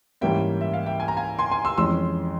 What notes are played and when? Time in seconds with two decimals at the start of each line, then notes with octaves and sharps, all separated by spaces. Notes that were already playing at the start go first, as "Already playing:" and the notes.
0.21 G#2 E3 G3 A#3 C#4 E5 G5
0.61 E5
0.74 F5
0.86 E5 G5
1.00 G#5
1.08 A#5
1.17 F5 G#5
1.39 G#5 C6
1.51 G#5 C6
1.65 C6 E6
1.78 F2 E3 G#3 C#4 C6 E6